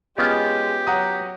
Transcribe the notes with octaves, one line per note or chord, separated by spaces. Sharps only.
G#3 B3 C#4 F4 G4
F#3 F#5 A#5 D#6